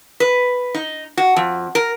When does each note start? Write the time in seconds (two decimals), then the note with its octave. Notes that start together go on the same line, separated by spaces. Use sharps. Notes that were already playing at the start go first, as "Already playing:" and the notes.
0.20 B4
0.75 D#4
1.17 F#4
1.36 F2
1.75 A#4